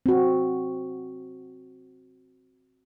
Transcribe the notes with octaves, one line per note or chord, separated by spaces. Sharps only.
C4 F#4